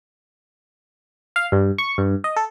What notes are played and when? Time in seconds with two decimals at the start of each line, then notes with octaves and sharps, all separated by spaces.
1.36 F5
1.52 G2
1.78 C#6
1.98 G2
2.24 D#5
2.36 A4